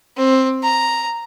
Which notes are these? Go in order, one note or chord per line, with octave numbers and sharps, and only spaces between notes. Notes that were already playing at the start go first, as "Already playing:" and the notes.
C4
A#5